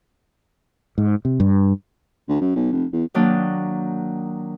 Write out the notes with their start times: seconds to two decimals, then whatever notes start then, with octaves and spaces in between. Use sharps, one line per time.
0.98 G#2
1.25 C3
1.40 G2
2.29 D2
2.41 F#2
2.56 B1
2.73 F1
2.93 E2
3.14 D#3 F#3 A#3 D4